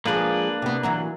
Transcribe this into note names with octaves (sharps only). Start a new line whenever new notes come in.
F3 G#3 A#3 D4 B4
C3 B3
E3 F#3 A#4